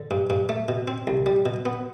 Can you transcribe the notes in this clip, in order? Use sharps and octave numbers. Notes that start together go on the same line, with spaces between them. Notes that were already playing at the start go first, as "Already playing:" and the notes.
Already playing: D3
G2
G2
A3
B2
C4
C2
G3
B2
B3